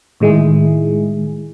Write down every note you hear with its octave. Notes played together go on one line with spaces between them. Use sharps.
A2 D#3 G#3 E4 G#4